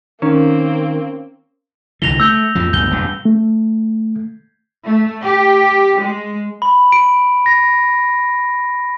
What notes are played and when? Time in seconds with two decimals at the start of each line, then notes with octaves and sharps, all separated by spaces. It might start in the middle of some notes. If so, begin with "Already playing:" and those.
0.22 D#3 A#3 C4 C#4
2.02 C2 D3 E3 A#6 F7 G7
2.20 A3 E6 G6 G7
2.55 F2 A#2 F3
2.73 D2 G2 B2 G6 G7
2.90 E1 G2
3.25 A3
4.85 A3
5.23 G4
5.99 G#3
6.62 B5
6.92 D7
7.46 A#6